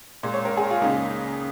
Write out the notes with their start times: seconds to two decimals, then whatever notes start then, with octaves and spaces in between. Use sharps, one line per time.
0.23 A#2 G#3
0.34 C#5
0.45 A#4
0.57 G#4
0.70 F4
0.82 C#2 C#3 A#3 D#4